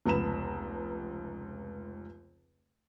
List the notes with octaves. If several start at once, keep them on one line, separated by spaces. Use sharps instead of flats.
F1 C#2 B3 A#5 B5 E7